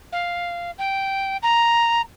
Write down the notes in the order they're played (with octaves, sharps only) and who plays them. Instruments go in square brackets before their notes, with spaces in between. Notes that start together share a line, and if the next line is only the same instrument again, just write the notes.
[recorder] F5
G5
A#5